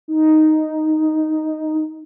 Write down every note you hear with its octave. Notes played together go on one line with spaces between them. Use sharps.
D#4